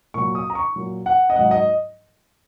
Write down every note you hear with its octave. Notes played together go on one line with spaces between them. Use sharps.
A#2 F#3 C#6
D#6
A#5
C#6
A#2 F#3
F#5
D#5
G#2 F#3 F#5
D#5